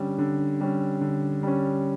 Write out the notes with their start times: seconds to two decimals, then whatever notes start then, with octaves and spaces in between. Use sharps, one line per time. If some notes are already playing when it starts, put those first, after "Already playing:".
Already playing: D3 G3 C#4
0.18 D3
0.61 G3 C#4
1.01 D3
1.43 G3 C#4